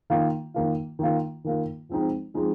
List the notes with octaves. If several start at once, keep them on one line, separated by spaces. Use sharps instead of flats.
D#3 A#3 F4
D#3 A#3 F4
D#3 A#3 F4
D#3 A#3 F4
F3 G#3 C4 D#4
F3 G#3 C4 D#4